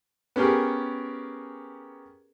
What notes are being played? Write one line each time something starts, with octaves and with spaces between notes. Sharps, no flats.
B3 C#4 G4 G#4 A#4